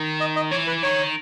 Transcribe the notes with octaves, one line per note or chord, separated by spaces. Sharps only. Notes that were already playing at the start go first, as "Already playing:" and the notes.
Already playing: D#3
D#5
D#5
E3 C#5
B4
D#3 C#5